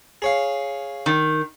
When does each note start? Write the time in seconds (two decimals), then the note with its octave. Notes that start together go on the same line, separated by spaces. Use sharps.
0.22 G#4 C#5 F5
1.06 D#3